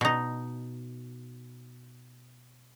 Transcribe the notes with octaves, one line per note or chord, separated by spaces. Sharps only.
B2 D#4